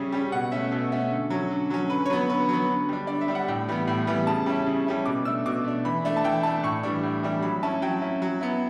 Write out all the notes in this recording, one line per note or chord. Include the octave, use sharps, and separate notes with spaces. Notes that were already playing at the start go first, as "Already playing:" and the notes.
Already playing: C#3 G3 C#4 E5
G3 C#4
B2 F#5
A3 C#4 E5
B2 A4
A3 C#4
D3
F#3 C#4
D3
F#3 C#4
D3 B4
C#5
F#3 B3 B4
D3 B4
F#3 B3
D3
G3 D4
D3 D5
E5
G3 D4
F#5
A2 G5
E3 G3 B3
A2
E3 G3 B3
C#3 A5
G3 C#4 E4
C#3
G3 C#4 E4
B2 D6
A3 D4 E6
B2 D6
A3 D4
E3 B5
A3 D4
A5
E3 G5
A3 D4 A5
A2 C#6
E3 G3 D4
A2
E3 G3 D4
F#3 B5
C#4 E4 A5
F#3 G5
C#4 E4
F#3
B3 E4